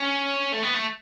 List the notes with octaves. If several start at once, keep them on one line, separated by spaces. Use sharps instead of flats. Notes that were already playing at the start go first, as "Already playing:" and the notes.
Already playing: C#4
A3
B3
A3